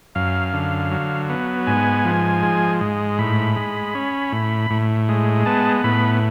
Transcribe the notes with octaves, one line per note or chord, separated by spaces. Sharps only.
F#2 F5
D3
F#3
B3
G#2 G#5
F3
G#3
G#2
A2 B5
G#3
C#4
A2
A2
G#3
B3 A5
A2 B5